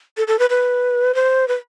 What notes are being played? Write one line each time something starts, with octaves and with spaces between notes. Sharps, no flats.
A4
A4
B4
B4
C5
B4